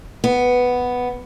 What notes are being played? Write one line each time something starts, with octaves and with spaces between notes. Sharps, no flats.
B3